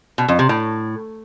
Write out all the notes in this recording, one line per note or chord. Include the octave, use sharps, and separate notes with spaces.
B2
F2
C3
A2